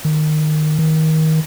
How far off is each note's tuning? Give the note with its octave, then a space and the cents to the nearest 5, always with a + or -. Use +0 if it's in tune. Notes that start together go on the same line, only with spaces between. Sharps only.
D#3 -20
D#3 +25